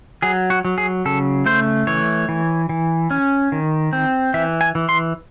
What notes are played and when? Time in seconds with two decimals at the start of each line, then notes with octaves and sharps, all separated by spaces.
0.22 F#3 G#4
0.50 F#4
0.65 F#3
0.78 G#4
1.05 C#3 A4
1.46 A3 C5
1.87 E3 C#5
2.29 E3
2.69 E3
3.11 C#4
3.52 D#3
3.93 C4
4.34 E3 E5
4.61 G#5
4.75 E3
4.89 C6